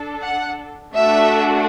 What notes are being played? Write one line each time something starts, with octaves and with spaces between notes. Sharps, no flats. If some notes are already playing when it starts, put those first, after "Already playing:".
Already playing: D4 A4
F#5
A3 D4 F#4 A4 E5